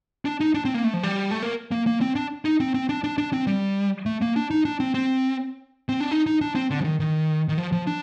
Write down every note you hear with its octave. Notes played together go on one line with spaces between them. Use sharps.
D4
D#4
D4
C4
A#3
A3
F3
G3
A3
A#3
A#3
A#3
C4
D4
D#4
C4
C4
D4
D4
D4
C4
G3
A3
A#3
D4
D#4
D4
C4
C4
C4
D4
D#4
D#4
D4
C4
D3
F3
D#3
D#3
D#3
F3
F3
D4